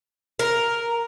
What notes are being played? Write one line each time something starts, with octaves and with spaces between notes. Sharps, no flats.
A#4